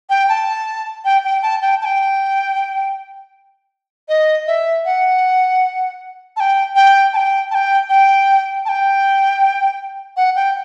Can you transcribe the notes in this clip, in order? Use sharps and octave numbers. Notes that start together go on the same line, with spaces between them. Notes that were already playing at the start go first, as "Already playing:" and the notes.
G5
A5
G5
G5
A5
G5
A5
G5
D#5
E5
F#5
A5
G5
G5
A5
G5
A5
G5
G5
A5
G5
F#5
G5